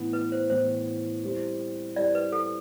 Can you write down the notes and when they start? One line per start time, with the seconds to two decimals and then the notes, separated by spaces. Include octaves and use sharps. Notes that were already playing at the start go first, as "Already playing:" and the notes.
Already playing: A2 E3 B3
0.13 B4
0.32 C5
0.50 A2 E3 B3 C5
1.24 G3 C4 E4 G4 C5
1.96 G3 C4 E4 G4 C5 D5
2.15 B4
2.32 A4